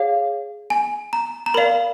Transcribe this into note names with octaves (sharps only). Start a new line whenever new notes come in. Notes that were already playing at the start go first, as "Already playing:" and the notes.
Already playing: G#4 C#5 F5
G#5
A#5
A#5
A#4 D5 F5 B5